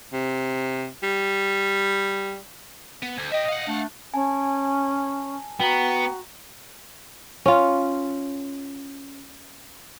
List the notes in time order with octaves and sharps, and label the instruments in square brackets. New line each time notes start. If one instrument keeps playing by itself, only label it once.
[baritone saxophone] C3
G3
[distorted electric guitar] B3
D2
[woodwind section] D#5 [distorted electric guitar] E5 G5
[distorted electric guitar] F5 F#5
[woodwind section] A3 D4
[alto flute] C#4 [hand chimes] G#5 A5
[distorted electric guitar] B3 [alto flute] F#4 [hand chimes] G5 A#5
[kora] C#4 F4